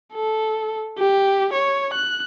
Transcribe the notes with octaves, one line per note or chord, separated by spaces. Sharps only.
A4
G4
C#5
F#6